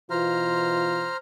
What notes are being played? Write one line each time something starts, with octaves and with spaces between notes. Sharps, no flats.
B2 E3 F4 C5 A#5 F6